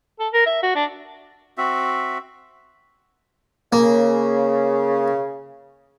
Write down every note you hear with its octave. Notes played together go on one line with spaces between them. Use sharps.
A4
A#4
E5
F#4
D4
C4 F#4 E5
C#3 A#3